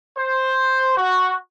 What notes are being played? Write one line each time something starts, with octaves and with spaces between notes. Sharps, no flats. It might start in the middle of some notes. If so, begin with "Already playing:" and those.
C5
F#4